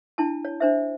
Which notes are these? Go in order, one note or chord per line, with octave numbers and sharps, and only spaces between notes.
D4 E4 A5
C#5
D4 C5 E5